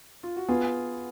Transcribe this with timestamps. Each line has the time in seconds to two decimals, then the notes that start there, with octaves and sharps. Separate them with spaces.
0.23 F4
0.36 F#4
0.48 B3 F4 G#4